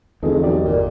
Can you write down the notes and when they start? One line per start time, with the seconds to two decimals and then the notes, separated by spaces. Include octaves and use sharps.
0.23 F1 E2 D3 F4 G#4 A4 D#5
0.43 B1 G4 D5
0.64 G1 A#2